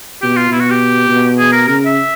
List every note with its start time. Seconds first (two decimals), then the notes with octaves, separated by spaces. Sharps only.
0.22 B2 G4
0.36 F4
0.51 B2 E4
0.61 F#4
0.70 G4
1.09 B2
1.38 G#4
1.52 A#4
1.68 C#3 A#4
1.86 E5